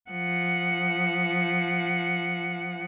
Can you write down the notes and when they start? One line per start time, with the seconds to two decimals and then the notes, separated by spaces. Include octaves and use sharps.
0.11 F3 F#5